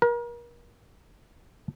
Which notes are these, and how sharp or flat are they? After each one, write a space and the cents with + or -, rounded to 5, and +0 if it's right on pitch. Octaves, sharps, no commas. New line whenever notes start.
A#4 +35